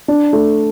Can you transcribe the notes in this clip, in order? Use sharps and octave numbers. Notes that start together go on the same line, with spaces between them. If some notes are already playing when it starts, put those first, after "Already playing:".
D4
A3